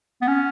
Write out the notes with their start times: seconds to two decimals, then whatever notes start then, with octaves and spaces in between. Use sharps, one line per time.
0.22 B3
0.27 C#4